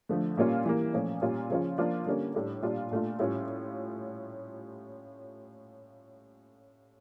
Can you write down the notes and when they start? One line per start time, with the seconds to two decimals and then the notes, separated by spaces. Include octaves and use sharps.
0.09 D3 F3 A3
0.37 A#2 G3 A#3 C#4 F4
0.66 E3 G3 A#3
0.94 A#2 F3 A3 C#4
1.21 A#2 G3 C#4 F4
1.50 C#3 F3 C#4 F4
1.78 F3 A#3 D4 F4
2.06 D3 G3 A#3 C#4
2.34 A2 G3 D4
2.62 A#2 G3 D4 F4
2.91 A#2 A3 D4 F4
3.19 A2 G3 C#4 F4